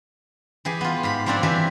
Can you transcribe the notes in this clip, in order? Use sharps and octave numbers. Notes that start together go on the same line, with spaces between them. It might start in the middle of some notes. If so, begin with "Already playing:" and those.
E3 G4 G#4
B3 F4
G#2 G4 B5
F3 A#3 C4 D4 D5
E3 C4 D4 G4 B4 E5